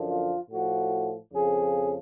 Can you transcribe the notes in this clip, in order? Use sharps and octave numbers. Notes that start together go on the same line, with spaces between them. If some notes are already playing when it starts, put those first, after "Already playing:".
Already playing: F#2 D3 F3
F4
A2 F3 F#4
F2 C#3 F3 G#4